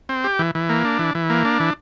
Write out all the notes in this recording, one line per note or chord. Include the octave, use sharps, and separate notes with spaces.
C4
G4
E3
E3
A#3
D4
E3
E3
A#3
D4
E3